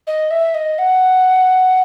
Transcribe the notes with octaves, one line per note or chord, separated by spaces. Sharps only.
D#5
E5
D#5
F#5